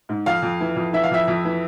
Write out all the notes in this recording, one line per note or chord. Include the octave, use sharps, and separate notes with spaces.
G#2
F2 F5
F2
E3
F2
E3 E5
F5
F2 E5
F2
E3